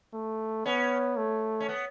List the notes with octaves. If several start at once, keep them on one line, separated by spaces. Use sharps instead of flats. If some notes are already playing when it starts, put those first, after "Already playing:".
A3
B3 C#4
A3
C#4
B3